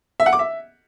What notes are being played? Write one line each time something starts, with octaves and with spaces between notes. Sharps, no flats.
E5
F#5
D6
E5